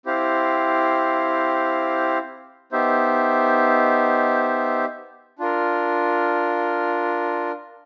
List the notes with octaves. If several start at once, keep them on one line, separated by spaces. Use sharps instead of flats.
C4 E4 G4 C5 F5
B3 D#4 G4 C5 E5
D4 F4 A#4